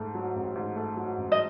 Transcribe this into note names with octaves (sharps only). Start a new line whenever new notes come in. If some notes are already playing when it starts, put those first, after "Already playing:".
Already playing: G#2 A3
F#3
A1
G#2
A3
F#3
A1
D#5